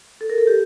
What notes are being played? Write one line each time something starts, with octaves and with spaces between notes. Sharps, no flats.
A4
A#4
A4
G4